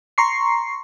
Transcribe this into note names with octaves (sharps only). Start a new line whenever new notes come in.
A#5 C6 C#6 C7